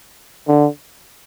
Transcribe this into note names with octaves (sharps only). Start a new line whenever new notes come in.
D3